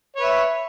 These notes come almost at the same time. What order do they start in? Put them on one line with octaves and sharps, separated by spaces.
C#5 B4 E5